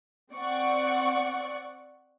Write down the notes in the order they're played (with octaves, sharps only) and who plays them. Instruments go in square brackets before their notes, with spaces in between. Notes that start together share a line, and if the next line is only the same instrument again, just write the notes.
[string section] C4 D5 F#5 C#6